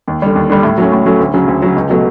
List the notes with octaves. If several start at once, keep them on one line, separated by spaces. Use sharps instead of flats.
D#2
D3 G3
D#2
D3 G3
A2
F#3 A3 C#4
A2
F#3 A3 C#4
D2
C#3 F#3
D2
C#3 F#3
C#2
B2 F#3 A3